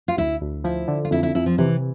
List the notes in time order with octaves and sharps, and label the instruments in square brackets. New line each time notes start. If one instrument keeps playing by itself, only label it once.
[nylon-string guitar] F4
[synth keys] D2 [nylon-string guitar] E4
[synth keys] D2
[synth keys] F3 [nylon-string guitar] E4
[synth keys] D3
[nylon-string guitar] F4
[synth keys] F2 [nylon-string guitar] E4
[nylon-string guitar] E4
[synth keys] F2 [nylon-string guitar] E4
[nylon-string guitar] F3
[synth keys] C3 [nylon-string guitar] E3